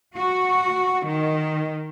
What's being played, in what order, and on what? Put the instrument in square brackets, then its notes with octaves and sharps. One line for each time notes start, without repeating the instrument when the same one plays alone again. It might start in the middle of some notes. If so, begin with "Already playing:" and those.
[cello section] F#4
D#3